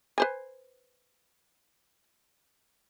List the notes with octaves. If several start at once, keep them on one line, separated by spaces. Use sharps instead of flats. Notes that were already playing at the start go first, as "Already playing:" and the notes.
B4 C5 G#5